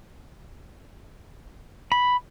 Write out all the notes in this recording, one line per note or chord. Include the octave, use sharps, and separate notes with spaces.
B5